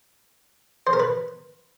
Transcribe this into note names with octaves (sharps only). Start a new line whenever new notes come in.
C5
A#4
B4